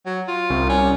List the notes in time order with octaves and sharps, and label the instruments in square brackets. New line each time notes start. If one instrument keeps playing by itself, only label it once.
[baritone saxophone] F#3
F4
[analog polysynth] C2
[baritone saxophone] C#4